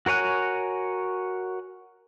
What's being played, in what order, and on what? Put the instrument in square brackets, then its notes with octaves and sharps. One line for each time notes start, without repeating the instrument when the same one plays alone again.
[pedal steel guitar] F#4 A#4 C#5 G#5 F#6